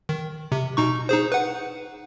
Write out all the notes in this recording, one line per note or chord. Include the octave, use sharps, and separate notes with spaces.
D#3
C3
B2 D#4 C#6
D#4 G#4 C5
B4 F#5